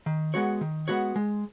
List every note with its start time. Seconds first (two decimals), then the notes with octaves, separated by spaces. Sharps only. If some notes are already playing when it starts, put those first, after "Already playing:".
0.06 D#3
0.34 G#3 B3 F#4 C#5
0.61 D#3
0.88 G#3 B3 F#4 C#5
1.16 G#3